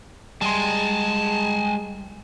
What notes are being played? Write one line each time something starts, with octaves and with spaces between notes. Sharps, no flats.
G3 G#3 G#5 A5 C6